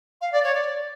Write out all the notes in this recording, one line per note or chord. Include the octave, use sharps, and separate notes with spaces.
F5
D5
C#5
D5